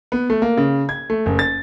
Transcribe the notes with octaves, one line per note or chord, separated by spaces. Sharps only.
B3
A3
A#3
C#3
G#6
A3
F#1
A6